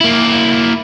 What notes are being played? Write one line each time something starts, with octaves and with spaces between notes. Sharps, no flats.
A#3 E4